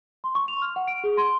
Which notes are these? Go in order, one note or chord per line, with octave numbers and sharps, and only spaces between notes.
C6
C#6
F7
F6
F#5
D7
G#4
C6